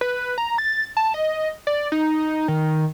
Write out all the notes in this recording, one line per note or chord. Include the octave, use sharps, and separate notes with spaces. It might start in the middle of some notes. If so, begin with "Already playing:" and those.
B4
A#5
A6
A5
D#5
D5
D#4
D#3